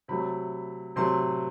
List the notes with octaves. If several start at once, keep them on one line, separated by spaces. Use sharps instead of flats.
C3 F#3 A3 B5
C3 F#3 A3 C6